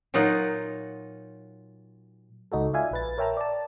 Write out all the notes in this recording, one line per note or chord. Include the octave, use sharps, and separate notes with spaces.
A#2 F#3 D#4 F4 F#5
C#2 D#4 F#4 A4
F4 D5 E5 F5 G#5
A#1 B4 A6
A#4 C#5 E5 G5 A5 A#5
D5 A5